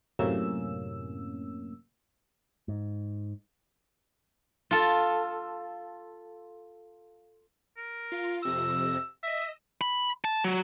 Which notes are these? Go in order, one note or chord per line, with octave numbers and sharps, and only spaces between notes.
F#2 A2 C3 A#3 C#4 E6
G#2
F4 A4
A#4
F4
F2 C3 E6 A#6
D#5 E5 E6 A#6
B5
A5
F#3